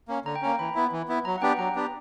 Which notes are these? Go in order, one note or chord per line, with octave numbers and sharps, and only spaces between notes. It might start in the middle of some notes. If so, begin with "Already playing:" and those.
A#3 C#4
D3 A#5
G5
A#3 C#4 A#5
E3 B5
B3 E4
E3
B3 E4
F#3 A#5
F#5
B3 D4 G4 G5
F#3 A#5
B3 D4 G4